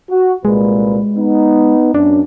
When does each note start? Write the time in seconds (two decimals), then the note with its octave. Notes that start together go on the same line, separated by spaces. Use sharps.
0.10 F#4
0.45 C2 A#2 G#3 B4
1.17 B3 D#4
1.94 F#2 C#4 D4